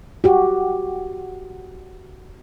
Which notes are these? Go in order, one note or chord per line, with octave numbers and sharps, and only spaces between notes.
F#4 G4